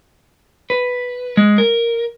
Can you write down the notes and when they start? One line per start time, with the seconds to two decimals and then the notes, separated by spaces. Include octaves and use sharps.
0.70 B4
1.37 G#3
1.58 A#4